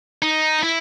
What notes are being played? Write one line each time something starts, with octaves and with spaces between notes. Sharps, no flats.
D#4
E4